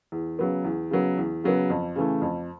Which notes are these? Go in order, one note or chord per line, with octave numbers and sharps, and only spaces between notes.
E2
C#3 F#3 B3
E2
C#3 F#3 B3
E2
C#3 F#3 B3
F2
C#3 E3 A3
F2